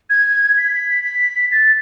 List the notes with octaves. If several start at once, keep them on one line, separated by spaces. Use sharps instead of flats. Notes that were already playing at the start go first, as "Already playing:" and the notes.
G#6
B6
B6
A6